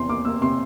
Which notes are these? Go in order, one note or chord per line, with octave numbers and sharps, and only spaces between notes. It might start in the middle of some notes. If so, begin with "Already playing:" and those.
Already playing: E2 C3 C6
A#3 D6
A#3 E6
C3 C6